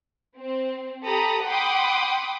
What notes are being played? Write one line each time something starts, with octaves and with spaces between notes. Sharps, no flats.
C4
G4 A4 A#5 B5 D#6
F#5 G5 B5 C6 D6 D#6